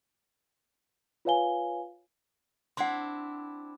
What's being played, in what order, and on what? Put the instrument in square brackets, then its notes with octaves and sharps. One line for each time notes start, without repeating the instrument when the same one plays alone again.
[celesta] F4 B4 C#5 F5 G#5 G7
[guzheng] C4 D4 E4 [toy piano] F#5 C6